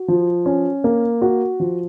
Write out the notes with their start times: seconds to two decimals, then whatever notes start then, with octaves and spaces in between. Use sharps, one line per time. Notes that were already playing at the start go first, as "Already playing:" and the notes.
Already playing: F#4
0.08 F3
0.46 C#4
0.84 A#3
1.22 F#4
1.60 F3